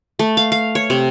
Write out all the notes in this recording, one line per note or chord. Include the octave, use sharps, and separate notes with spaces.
A3
F5
F5
C#5
C3